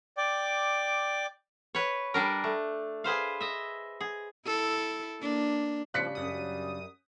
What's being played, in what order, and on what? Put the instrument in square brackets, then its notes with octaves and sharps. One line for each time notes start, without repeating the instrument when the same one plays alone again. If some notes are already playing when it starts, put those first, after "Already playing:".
[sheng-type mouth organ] D5 G5 D6
[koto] B4 C#5
G3 D4 A#4
A3
G#4 B4 C5 F5
D#5 E5
G#4
[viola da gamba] E4 A4
A#3 D4
[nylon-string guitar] C#3 D4 [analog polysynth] F3 [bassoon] G3 [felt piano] F#6 B6 C#7
[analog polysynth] F#2 D#6